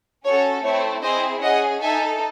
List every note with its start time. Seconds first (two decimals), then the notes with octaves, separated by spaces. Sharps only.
0.25 C#4 F#4 A4 C#5
0.64 A3 C4 E4 C#5
1.03 C4 E4 G#4 C5 D#5
1.43 C#4 G#4 D#5 F#5
1.82 D#4 A4 E5 G#5